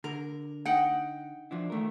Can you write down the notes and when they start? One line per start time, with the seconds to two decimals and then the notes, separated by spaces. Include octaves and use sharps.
0.04 D3 A#4
0.65 D#4 F#5 G5
1.51 F3 D4 E4
1.70 D#3 A3 A#4